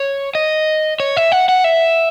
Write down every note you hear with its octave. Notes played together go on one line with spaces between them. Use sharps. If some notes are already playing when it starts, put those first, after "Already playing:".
Already playing: C#5
D#5
C#5
E5
F#5
F#5
E5